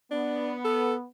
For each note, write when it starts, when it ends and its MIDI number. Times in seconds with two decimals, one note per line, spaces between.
0.11 1.05 59
0.11 0.52 62
0.65 0.94 69